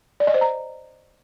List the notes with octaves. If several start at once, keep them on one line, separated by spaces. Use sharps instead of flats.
D5
D#5
C5
A#5